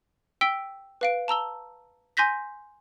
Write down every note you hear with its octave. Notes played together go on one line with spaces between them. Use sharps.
G5 E6 B6 D7 G7
B4 F5 D7
A5 A#5 E6 G7
G#5 C6 G6 A#6 B6